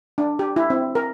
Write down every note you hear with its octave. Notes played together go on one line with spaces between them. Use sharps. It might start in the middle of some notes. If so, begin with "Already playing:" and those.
D4
G4
E4
C4
A#4